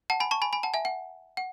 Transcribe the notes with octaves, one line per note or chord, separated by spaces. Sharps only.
F#5 A5
G#5 B5
A5 C#6
G#5 B5
G#5 B5
F#5 A5
E5 G#5
F#5
F#5